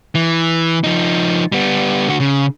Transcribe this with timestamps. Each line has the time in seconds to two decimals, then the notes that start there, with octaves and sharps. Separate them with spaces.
0.15 E3
0.84 F3 D#4
1.52 G3 B3
2.08 D3 F#4
2.20 C#3